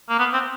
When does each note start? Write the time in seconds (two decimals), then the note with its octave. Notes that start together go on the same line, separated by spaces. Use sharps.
0.10 A#3
0.19 B3
0.34 C4